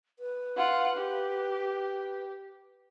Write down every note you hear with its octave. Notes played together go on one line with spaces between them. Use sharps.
B4
F4 F#5
G4